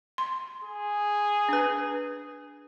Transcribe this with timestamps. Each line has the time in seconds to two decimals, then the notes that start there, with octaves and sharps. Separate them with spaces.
0.18 C6
0.64 G#4
1.49 D4 B4